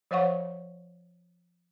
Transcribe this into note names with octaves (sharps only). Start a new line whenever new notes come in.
F3 C5 C#5 F5 F#5 C#6